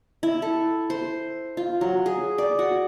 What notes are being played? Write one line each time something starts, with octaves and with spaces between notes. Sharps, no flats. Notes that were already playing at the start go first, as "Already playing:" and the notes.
E4
A4
C5
F4
F#3
G#4
D5
F#4